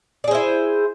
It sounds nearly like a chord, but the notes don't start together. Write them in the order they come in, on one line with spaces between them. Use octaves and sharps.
D5 G#4 C5 E4